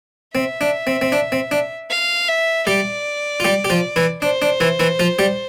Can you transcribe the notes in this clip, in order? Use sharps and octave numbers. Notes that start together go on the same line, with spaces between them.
C4 E5
D4
C4
C4
D4
C4
D4
F5
E5
G3 G4 D5
F4
G3 G4
G4
F3 F4
E3 E4
D4 C5
D4
E3 E4
E3 E4
F3 F4
G3 G4